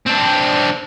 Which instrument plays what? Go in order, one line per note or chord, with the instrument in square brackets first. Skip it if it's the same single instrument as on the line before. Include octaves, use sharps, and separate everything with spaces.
[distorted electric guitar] C4 D4